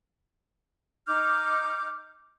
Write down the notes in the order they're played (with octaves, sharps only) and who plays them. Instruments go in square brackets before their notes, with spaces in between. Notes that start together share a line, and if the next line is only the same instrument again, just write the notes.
[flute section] D#4 D6 F6 G6